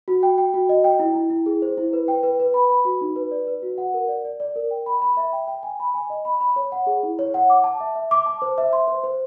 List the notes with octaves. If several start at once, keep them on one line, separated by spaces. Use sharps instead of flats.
F#4
G5
G5
F#4
D#5
G5
E4
E4
E4
G#4
C5
E4
B4
G5
B4
B4
B5
B5
F#4
D#4
B4
D5
B4
F#4
F#5
A#4
D5
D5
D5
A#4
G5
B5
B5
E5
G5
G5
G#5
B5
G#5
D#5
B5
B5
C#5
F#5
G#4
E4
C#5
F#5
D6
A5
E5
E5
D6
A5
C5
E5
C6
C5
C5